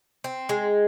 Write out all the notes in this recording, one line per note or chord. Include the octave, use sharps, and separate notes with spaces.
C4
G#3